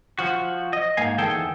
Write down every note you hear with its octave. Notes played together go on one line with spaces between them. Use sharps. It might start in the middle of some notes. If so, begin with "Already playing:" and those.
F3 F#4
D#5
G#2 A#3 F5 G#5
E2 D#3 G#4 A4 G5 A5